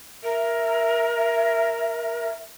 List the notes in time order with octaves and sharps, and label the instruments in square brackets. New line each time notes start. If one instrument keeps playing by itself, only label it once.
[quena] A#4 [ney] E5